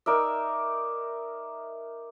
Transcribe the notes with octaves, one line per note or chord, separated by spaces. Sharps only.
D#4 A#4 D5 E5